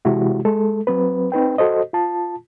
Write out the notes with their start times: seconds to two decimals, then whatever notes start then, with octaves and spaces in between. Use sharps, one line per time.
0.05 C3 E3 G#3 E4 F#4 G4
0.45 G#3 A4
0.87 F#3 C4 B4
1.32 C4 D#4 B4 G5
1.58 F#4 A4 C5 D#5
1.93 F4 A5